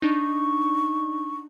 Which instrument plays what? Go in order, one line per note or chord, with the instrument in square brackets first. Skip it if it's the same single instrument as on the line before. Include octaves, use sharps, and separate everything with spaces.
[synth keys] D4 D#4 [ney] C#6